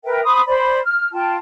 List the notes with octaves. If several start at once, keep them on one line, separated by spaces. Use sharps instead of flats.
A#4 B4 E5 G5
C5 B5 D#6
C5 D5 B5
F6
F4 G5 A5